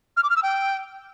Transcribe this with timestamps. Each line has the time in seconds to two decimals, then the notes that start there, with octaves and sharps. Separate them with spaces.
0.17 F6
0.23 D6
0.30 F6
0.36 E6
0.43 G5